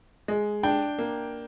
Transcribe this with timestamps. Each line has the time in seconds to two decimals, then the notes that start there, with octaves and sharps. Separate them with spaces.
0.28 G#3
0.63 D4 G5
0.98 A#3